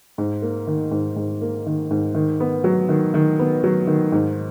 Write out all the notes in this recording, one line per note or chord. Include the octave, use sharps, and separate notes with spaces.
G#2
A#3
D#3
G#2
G#2
A#3
D#3
G#2
D#3
B3
F#3
D#3
D#3
B3
F#3
D#3
G#2